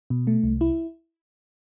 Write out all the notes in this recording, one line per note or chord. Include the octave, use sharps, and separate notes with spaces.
B2
A3
C2
E4